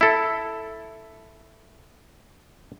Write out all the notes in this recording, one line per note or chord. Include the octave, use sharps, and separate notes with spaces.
E4 A4